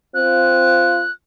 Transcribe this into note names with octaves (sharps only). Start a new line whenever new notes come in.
C4 F4 F#6